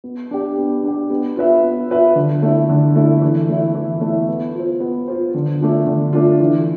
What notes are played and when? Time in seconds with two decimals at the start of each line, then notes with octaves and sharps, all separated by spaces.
0.04 B3
0.31 D4 G4
0.58 B3
0.84 D4 G4
1.10 B3
1.36 F4 B4 E5
1.63 B3
1.90 F4 B4 E5
2.16 D3
2.42 A3 E4
2.69 D3
2.96 A3 E4
3.22 E3
3.49 A3 E4
3.75 E3
4.01 A3
4.06 E4
4.29 B3
4.55 F4 C5
4.80 B3
5.08 F4 C5
5.35 D3
5.60 A3 D4 F4
5.86 D3
6.13 A3 D4 F4
6.40 E3